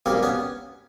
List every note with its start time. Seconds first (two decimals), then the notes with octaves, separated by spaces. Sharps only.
0.06 B1 A#2 G3 A#3 C4
0.23 B3 C#4